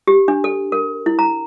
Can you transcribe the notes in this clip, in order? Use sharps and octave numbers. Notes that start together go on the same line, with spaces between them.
G4
D4
A4
A#4
E4
A#5